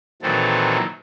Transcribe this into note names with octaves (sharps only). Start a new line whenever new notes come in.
A#2 D#3 E3 F#3 C4 A4